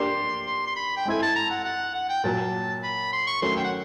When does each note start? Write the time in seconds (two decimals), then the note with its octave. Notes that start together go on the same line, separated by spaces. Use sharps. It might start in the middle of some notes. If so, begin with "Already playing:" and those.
Already playing: A#3 D4 G4 C6
0.47 C6
0.67 C6
0.76 B5
0.97 G5
1.06 G#3 C4 E4 A4 G#5
1.23 A5
1.36 A#5
1.50 F#5
1.64 F#5
1.95 F#5
2.09 G5
2.24 A#2 F#3 A#3 A5
2.83 B5
3.13 C6
3.27 C#6
3.42 D#3 F#3 A3 C#4 C6
3.57 G5
3.64 F#5